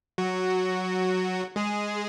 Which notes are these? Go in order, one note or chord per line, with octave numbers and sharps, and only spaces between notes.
F#3 F#4
G#3 G#4